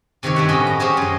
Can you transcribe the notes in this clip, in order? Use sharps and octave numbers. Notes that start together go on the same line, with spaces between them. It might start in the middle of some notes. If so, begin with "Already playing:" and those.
C3 D#3 G4 C#5
G2 E4 D5 E5 F#5
A2 C#4 F#4 G4 D#5 B5
A#5
C#4 G4 G#4 C5 C#5
F#2 D#5